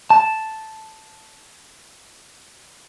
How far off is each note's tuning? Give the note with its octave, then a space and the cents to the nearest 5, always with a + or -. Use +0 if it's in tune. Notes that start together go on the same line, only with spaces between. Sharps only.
A5 -5